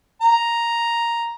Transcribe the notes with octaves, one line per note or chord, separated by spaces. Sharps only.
A#5